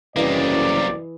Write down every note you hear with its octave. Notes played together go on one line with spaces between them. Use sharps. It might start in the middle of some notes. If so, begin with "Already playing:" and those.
F#1 C2 F#2 C3 E3 A#3 D5 D#5